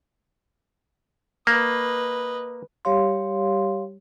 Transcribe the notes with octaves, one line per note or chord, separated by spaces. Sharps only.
A#3 B4 D#5
G3 G4 C#5 F5 C6